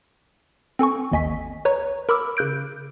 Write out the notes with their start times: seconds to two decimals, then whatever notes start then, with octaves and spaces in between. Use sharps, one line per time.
0.79 C4 A4 G#5 C#6
1.11 G#1 D#2 D#5 G#5 B6
1.65 B4 C#5 A#5 C#6
2.09 A#4 B5 C#6 D6 E6 F6
2.37 C#3 F#6 G6 D7